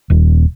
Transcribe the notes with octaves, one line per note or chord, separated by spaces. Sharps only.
D#1